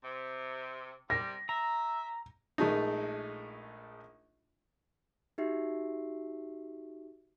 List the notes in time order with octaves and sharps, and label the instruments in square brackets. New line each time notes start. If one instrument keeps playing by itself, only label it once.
[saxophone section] C3
[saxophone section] C3 G3 [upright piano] A#6
[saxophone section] E5 [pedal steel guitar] A#5
[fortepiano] A#1 G#3 A3 D#4
[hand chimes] D#4 F#4 G4 E5 C7